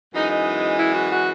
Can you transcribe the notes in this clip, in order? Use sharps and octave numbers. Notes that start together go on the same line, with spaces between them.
F#2 E3 G#3 D#4
D#4
E4
F#4
F#4